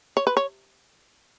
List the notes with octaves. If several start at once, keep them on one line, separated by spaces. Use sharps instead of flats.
C#5
B4
C#5